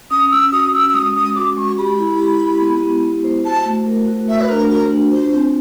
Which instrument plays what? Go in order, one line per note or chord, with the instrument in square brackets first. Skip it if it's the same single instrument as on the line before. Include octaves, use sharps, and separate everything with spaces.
[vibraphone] C#4 [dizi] D#6
[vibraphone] C#4 [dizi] E6
[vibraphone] F#4 [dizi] D#6
[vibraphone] C#4 [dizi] E6
[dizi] E6
[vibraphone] G#3 [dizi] D#6
[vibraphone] G#3 [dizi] D#6
[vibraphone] F#4 [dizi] D6
[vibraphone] G#3 [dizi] C#6
[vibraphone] G4 [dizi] B5
[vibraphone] E4
G4
E4
B3
B3
B3
C5
[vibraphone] F#4 [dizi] A5
[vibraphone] A3
A#4
F#4
[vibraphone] A3 [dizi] E5
[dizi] B4
[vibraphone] D4 [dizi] A#4
[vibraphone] F#4 [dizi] A#4
[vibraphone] D4
[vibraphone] F4 [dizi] C5
[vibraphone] C4